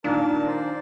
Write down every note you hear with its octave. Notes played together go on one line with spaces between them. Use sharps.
A#2 D#3 D4 A#4 A5
C5 D5